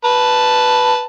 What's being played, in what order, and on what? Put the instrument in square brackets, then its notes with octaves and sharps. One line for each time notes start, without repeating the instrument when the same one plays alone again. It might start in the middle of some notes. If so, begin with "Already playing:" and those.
[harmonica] B4 A5